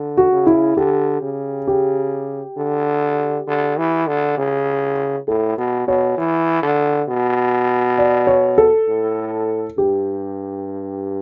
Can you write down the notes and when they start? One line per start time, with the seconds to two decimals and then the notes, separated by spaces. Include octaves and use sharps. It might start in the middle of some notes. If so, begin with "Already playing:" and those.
Already playing: D3
0.17 F#4
0.32 C#3
0.47 E4
0.77 D3 G4
1.22 C#3
1.68 G4
2.57 D3
3.47 D3
3.77 E3
4.07 D3
4.38 C#3
5.28 A2 A4
5.58 B2
5.87 B2 C#5
6.18 E3
6.62 D3
7.08 B2
7.98 D5
8.27 C#5
8.58 A4
8.88 A2
9.78 G2 G4